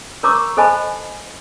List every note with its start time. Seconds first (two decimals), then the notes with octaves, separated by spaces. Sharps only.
0.23 A#4 C#5 A#5 C#6 D6 E6
0.57 A4 C5 D#5 G#5 A5 B5